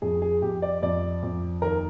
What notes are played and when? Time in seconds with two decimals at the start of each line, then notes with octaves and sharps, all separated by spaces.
0.02 F2 G#4
0.22 G#4
0.42 F2 G4
0.62 D5
0.82 F2 D5
1.23 F2
1.62 D#2 A#4